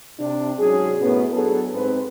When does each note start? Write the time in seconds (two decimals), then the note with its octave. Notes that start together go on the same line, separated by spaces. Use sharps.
0.19 C3 D4
0.59 G#2 F#3 C#4 G#4
1.01 F#2 A2 B3
1.32 F#3 B3 D4 G#4 A4
1.73 G#2 C4 B4